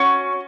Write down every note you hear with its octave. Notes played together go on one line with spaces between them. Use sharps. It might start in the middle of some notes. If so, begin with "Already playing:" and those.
Already playing: C#4 F#4